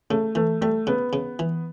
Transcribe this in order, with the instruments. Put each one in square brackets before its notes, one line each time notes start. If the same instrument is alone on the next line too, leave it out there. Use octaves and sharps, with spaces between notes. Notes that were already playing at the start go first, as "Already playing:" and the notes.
[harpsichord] C#3 [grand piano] A3
[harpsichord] E3 [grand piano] A3
[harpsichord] G3 [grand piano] A3
[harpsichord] C#3 [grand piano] B3
[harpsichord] C#3
E3